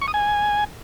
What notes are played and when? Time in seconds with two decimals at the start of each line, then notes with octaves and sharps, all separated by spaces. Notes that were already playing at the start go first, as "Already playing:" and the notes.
0.01 C#6
0.08 D#6
0.14 G#5